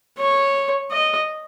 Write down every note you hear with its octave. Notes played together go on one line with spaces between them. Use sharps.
C#5
D#5